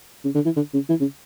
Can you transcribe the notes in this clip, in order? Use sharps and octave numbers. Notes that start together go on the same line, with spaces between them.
C#3
D3
E3
D3
C#3
E3
C#3